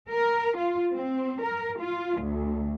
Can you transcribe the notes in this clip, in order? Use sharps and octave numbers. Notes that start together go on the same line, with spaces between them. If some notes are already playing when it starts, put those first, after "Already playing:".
A#4
F4
C4
A#4
F4
D2